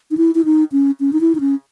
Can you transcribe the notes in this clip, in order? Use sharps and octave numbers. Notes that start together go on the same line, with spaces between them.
D#4
E4
E4
D#4
C#4
C#4
D#4
E4
D#4
C#4